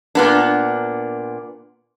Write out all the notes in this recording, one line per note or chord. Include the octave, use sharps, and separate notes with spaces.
A#2 B3 D4